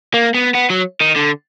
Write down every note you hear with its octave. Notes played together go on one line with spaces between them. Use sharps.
A#3
B3
B3
F#3
D#3
D3